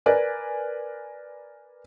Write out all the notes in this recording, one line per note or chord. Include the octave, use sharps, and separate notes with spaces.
A#4 B4 D5 G#5